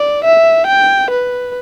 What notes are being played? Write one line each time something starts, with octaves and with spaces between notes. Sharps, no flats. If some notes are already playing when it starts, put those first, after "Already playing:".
Already playing: D5
E5
G5
B4